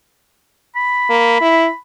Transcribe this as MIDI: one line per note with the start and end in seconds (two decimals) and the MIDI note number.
0.76 1.77 83
1.09 1.40 58
1.41 1.68 64